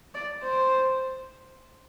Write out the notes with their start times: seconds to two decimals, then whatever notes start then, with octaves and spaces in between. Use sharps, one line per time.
0.14 D5
0.43 C5